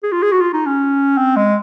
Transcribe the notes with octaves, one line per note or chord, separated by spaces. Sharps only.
G#4
F4
G#4
F#4
F4
D#4
C#4
C4
G#3